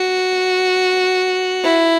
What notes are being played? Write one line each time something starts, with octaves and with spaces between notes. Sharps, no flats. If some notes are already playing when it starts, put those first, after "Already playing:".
Already playing: F#4
E4